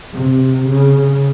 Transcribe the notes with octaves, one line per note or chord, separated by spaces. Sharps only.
C3
C#3